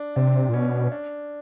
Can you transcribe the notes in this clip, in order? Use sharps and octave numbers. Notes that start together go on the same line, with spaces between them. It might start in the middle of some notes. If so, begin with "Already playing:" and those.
Already playing: D4
C3 D4
A#2
B2 C#4
D4